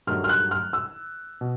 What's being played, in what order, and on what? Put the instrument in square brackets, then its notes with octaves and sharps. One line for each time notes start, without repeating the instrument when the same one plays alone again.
[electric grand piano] G2 D#3 F#3 A3 [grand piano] F6
[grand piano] F6
F#6
F6
E6
[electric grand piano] B2